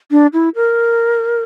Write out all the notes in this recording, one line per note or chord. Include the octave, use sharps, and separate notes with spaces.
D4
E4
A#4